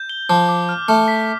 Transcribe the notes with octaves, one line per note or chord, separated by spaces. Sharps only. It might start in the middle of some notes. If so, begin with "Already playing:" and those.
Already playing: G6
G7
F3 D6
D6
F6
A3 F6
B6